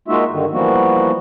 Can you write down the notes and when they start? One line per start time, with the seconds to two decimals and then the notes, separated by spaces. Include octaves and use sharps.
0.08 G#3 A#3 D#4 F4 F#4 E5
0.30 G2 D3 D#3
0.52 E3 F3 G3 A#3 B3 F#4